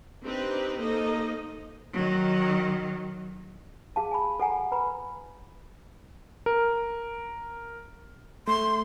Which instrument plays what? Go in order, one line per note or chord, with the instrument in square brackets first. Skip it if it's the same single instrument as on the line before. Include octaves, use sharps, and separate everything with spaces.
[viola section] C4 D4 D#4 G4 B4 C5
A#3 D#4 A4 C5 D#5
[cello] D#3 F#3
[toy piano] G#4 F5 A5
G#5 B5
A4 F#5 G#5 A#5
B4 A#5 B5
[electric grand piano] A#4
[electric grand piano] A3 [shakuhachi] C6